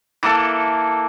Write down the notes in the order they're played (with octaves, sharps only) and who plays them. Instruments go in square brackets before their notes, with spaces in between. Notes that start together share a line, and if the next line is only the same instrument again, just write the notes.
[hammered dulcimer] E3 A#3 A4